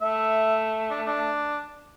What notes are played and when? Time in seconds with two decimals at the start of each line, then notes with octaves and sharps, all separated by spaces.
0.02 A3 E5
0.90 D4
1.06 D4